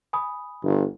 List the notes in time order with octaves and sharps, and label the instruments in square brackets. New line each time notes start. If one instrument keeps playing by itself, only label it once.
[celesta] G#5 B5 D#6
[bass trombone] G1